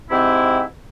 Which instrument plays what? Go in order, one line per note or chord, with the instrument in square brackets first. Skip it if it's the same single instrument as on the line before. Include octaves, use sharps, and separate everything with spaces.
[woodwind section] G#2 C3 C4 E4